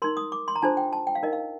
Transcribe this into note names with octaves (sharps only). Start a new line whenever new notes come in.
D#4 A#4 C6
D#6
D6
C6
A#5
D4 F4 A4 C5 A5
G5
A5
G5
F5
D#4 A#4 D#5
F5